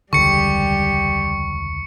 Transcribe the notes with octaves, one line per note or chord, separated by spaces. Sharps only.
E1 C#2 D3 G3 G4 C#6 C#7